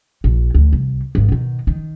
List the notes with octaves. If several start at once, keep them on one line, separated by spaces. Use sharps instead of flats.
A#1
D2
C2
G#1 B3
B2 D#3
D#3